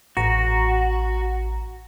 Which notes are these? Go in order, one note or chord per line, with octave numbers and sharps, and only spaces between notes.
A1 F#4 A#5